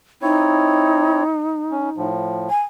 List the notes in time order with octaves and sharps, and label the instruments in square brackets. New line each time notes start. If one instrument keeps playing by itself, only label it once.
[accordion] C4 E4 C#5 [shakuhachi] D#4
[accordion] C#4
A2 F3
[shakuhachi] G#5